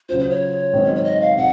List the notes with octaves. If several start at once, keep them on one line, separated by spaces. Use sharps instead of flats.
C#3 F#3 C#4 F4 C5
C5
C#5
G#2 D#3 F#3 C4 D#4
C#5
D#5
F5
C3 F#3 F#5